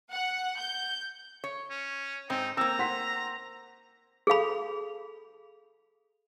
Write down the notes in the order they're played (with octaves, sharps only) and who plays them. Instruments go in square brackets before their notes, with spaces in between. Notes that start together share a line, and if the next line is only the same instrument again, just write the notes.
[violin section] F#5
G6
[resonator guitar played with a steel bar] C#5
[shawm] C#4
[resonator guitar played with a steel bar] G#2 C4 [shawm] D#4
[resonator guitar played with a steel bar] A#3 C4 [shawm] A#5 [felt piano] E6
[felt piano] F#5 C6 B6
[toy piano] G#4 A4 F5 B5